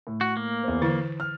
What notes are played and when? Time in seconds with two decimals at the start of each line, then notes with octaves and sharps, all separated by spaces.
0.07 A2
0.21 F#4
0.37 A#3
0.63 E2 C5
0.82 D3 E3 E4 A6
1.20 F6